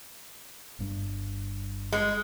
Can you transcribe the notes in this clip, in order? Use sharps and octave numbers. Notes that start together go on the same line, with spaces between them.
G1 G2
G#3